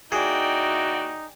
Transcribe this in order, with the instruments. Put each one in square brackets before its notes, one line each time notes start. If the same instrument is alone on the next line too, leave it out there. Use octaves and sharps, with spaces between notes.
[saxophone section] D#2 E4 F#4 [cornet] D#4 [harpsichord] G#4 [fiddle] D5 G5